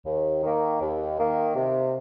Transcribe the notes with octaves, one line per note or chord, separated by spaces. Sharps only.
D#2
D#3 A#3
D#2
D#3 A#3
C3